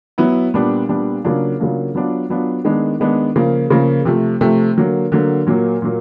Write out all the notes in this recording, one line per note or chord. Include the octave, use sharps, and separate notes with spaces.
F#3 B3 E4
A#2 G3 B3 D4
A#2 G3 B3 D4
C#3 F#3 A#3 D4 F4
C#3 F#3 A#3 D4 F4
F#3 B3 D4 F4
F#3 B3 D4 F4
D#3 G#3 B3 D4
D#3 G#3 B3 D4
C#3 F3 A#3
C#3 F3 A#3
C3 F3 A3
C3 F3 A3
D3 F#3 A#3
D3 F#3 A#3
A#2 F#3 A#3
A#2 F#3 A#3